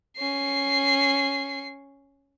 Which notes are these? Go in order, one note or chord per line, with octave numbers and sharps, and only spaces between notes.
C#4 C7